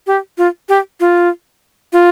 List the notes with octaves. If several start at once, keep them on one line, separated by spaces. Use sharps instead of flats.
G4
F4
G4
F4
F4